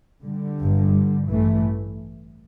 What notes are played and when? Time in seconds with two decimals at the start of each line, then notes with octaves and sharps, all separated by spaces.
0.23 D3 G3
0.59 G1 G2
1.29 A1 G2 E3 A3